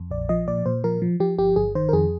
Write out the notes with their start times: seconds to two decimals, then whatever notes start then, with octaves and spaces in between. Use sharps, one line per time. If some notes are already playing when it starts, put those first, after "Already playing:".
Already playing: F2
0.11 A#1 D5
0.29 F3 D#5
0.47 A#2 D5
0.66 A#2 C5
0.84 F3 A#4
1.02 F3
1.20 F3 G4
1.38 G1 G4
1.56 G1 G#4
1.75 D#3 C5
1.89 A#4
1.93 F2 G#4